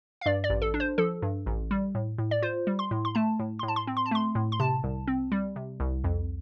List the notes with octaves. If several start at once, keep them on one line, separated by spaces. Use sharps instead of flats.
F5
G2 D5
D5
A1
A4
D4
C5
F3 A4
G2
A1
G3
A2
A2
D5
F4 C5
G3
C6
A2
C6
A3 A5
A2
C6
A2
A5
C6
C4
C6
A5
A3 C6
A2
C6
C3 A5
C2
C4
G3
C3
C2
F2